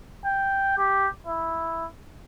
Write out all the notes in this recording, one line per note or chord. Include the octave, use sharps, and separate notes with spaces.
G5
G4
E4